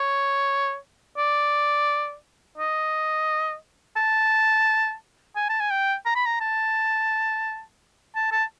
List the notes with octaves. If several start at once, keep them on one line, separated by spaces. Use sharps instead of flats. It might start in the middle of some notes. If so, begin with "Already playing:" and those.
Already playing: C#5
D5
D#5
A5
G#5
A5
G#5
G5
A#5
B5
A#5
A5
A5
A5